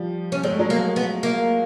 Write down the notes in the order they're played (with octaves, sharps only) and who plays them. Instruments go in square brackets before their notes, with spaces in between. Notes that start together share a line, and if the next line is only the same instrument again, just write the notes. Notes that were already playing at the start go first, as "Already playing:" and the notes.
Already playing: [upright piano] F3 G3
[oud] C#4
[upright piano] G#3 [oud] C4
[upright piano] A3
F#3 G#3
[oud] A#3
B3
A#3